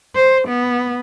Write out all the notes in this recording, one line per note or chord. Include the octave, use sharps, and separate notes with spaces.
C5
B3